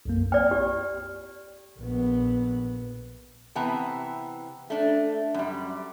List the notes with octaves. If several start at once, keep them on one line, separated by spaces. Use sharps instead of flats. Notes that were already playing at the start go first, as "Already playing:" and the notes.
B1 F#2 A#3
D5 G5 F6
G4
A#1 B3
C3 E3 B3 A5 A#5
A3 D4
F#2 G3